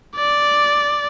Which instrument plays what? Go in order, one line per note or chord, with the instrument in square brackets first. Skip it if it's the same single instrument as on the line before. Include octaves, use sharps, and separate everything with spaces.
[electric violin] D5